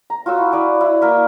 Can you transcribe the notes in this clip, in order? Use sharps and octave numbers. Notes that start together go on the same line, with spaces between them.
A#5
F4 F#4 C#5 E6
E4
E4 D5 G#5
E4
A#3 A#4 E5